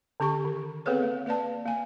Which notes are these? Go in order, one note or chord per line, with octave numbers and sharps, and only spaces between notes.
D3 C#4 G4 C#6
D#3
B3 C4 G#4 A4 B4 C#5
A#3
A#3 B4 D5 A5
A#3 G#5